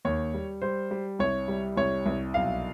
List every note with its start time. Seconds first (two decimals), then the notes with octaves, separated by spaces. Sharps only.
0.05 D#2 C#5
0.34 G3
0.62 G3 C5
0.91 G3
1.19 C2 C#5
1.48 G3
1.77 C2 C#5
2.06 C2
2.34 B1 F5